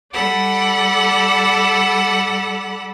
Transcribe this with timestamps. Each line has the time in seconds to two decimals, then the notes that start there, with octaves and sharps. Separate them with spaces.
0.14 G3 A4 D5 F#5 B5